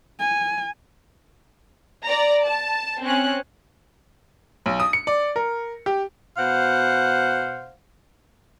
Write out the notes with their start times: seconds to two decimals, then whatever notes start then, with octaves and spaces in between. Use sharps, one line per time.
0.20 G#5
2.05 D5 A#5
2.45 A5
3.03 C4 C#4 F#6
4.66 B1
4.80 D#6
4.93 C#7
5.07 D5
5.36 A#4
5.86 G4
6.38 B2 C5 F5 F#5